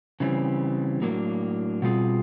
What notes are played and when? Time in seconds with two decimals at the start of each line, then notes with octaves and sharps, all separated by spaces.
0.20 C#3 E3 G3 C4
1.01 A2 F#3 A#3 D4
1.82 B2 G3 C4 F4 G#4